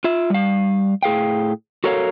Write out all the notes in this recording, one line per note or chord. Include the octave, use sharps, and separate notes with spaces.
F4 E5
G3 F5
A2 G#4 F5 G5
F#4 A4 A#4 C#5 D#5 F5